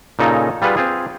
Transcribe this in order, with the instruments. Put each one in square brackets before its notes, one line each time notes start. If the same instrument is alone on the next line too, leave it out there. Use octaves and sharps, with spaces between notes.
[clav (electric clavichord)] A#2 C#3 D#4 A4 G#5 A#5
G3 F4 G#4 B4 F#5
C4 F4 G#4